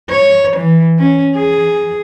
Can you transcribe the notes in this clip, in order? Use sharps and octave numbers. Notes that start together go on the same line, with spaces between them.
C#5
E3
C#4
G#4